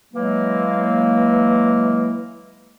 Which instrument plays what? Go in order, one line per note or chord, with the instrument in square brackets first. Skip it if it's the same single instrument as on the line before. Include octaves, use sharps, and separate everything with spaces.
[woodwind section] E3 F#3 G#3 A#3